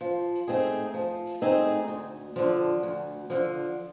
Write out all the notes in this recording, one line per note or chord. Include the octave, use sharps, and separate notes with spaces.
F3
A3 C4 D#4 G#4
F3
A3 C4 D#4 G#4
D2
D3 F3
D2
D3 F3